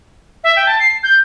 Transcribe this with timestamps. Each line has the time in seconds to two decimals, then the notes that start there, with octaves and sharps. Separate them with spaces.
0.44 E5
0.56 G5
0.67 A5
0.80 C7
1.03 G6